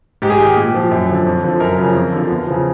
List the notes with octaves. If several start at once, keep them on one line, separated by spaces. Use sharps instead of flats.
G#2 G4
G#4
D#3 G4
A#2
F3
F#2
D3 F3
F2
D3 F3
F#2 A#4
C#3 F3
F2
D3 F3
E2
C#3 F3